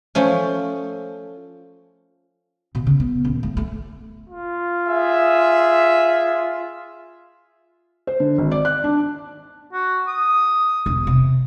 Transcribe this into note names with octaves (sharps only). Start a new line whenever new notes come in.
F3 A3 C#4
B2
C#3
B3
D#1
A3
A3
F4
G#4 E5
C5
D3
G#1
D5
F#6
D4
F#4
D#6
E1
C3